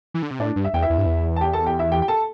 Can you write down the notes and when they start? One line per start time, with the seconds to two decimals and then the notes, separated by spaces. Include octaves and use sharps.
0.14 E3
0.22 D3
0.31 C3
0.39 A2 D4 D5
0.56 G2
0.64 E5
0.74 E2 G5
0.82 E4 E5
0.90 E2
0.98 G2
1.06 E2
1.36 A5
1.41 G4 G5
1.53 A4 A5
1.66 G4 G5
1.79 E4 E5
1.92 G4 G5
2.02 G5
2.08 A4 A5